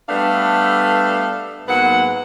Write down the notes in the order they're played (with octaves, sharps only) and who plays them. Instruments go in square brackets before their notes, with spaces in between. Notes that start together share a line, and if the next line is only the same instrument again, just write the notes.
[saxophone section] G3 A3 B3 D4 A4 F5
G#2 F#3 A#3 B3 F#5